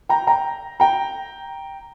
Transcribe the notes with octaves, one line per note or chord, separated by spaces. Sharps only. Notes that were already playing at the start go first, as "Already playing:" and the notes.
G5 A#5
G5 A#5
G5 A#5